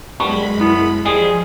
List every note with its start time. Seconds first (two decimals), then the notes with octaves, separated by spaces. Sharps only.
0.20 F#2 G3 G#3 B3 B5 C#6
0.60 C2 B3 E4
1.05 F3 G3 G#3 G#4 C7